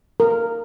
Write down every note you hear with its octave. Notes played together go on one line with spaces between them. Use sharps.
A#4